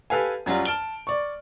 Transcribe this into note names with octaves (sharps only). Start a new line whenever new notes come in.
G4 A4 B4 F5 G#5
F#2 F#3 G3 F4
A5 F6 D7 G7
D5 C#6